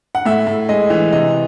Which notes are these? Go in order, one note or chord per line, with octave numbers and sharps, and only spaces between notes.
F#5
A2 E5
A2
G#3 D#5
E3
C3 D#5